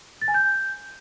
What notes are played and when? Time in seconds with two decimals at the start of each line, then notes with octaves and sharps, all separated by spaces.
0.22 A6
0.28 G#5
0.34 G6